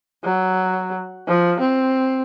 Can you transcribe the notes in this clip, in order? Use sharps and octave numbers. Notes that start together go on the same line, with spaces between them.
F#3
F3
C4